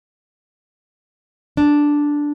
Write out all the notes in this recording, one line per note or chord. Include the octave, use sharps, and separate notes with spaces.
D4